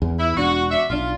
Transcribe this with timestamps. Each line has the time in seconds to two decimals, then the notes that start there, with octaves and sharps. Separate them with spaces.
0.02 E2
0.19 E4
0.37 E1 D4 F#4
0.71 F#4 D5 E5
0.90 B1 D4 F4